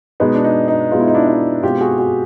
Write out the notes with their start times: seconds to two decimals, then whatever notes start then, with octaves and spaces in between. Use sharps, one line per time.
0.20 B2 G#3 B3 D#4
0.34 D4
0.44 D#4
0.68 D#4
0.92 B2 G#3 B3 F4
1.00 E4
1.08 D#4
1.15 D4 E4
1.28 D#4
1.63 B2 G#3 C4 F4 G4
1.81 F#4 G#4
1.98 F#4 G#4